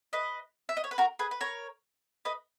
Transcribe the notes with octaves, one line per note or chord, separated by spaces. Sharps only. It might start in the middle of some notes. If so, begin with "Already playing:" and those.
B4 D#5
E5
D#5
C#5
B4
F#4 A#4
G#4 B4
B4
A#4 C#5
B4 D#5